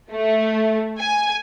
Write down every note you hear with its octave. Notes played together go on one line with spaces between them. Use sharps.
A3
G#5